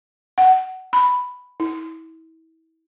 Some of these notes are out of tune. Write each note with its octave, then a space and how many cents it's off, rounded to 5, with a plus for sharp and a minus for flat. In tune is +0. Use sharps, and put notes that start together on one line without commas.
F#5 +20
B5 +5
E4 -35